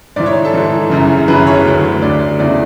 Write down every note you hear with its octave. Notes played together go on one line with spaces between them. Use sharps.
G#2 E3 D5
C#5
A4
G#2 E3
F#2 C#3 E3
F#2 C#3 E3 B4
C#5
D2 D3
D2 D3 D5
E2 C#3 E3 D5